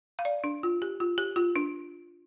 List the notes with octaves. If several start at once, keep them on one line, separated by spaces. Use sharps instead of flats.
F5
D5
D4
F4
G4
F4
G4
F4
D4